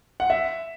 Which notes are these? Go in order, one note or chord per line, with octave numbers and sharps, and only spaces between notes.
F#5
E5